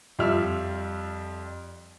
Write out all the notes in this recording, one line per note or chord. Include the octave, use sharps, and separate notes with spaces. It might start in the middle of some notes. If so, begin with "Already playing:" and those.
F2 G3 F4 E5 F6